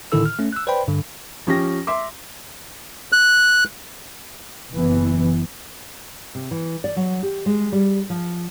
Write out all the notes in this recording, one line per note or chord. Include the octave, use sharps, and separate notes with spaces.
A2 D3 D#3 E4 A4 E6
F6
A3 C#4
E6 F#6
B4 C5 D5 G5 B5
G2 D3
F3 C#4 G4 A#6
E5 C6 D6
F#6
F#1 E3 B3
C3
E3
D5
F#3
G4
G#3
G3
F3